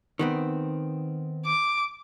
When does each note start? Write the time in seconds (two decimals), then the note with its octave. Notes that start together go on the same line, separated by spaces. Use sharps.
0.19 D#3 B3 C4
1.46 D6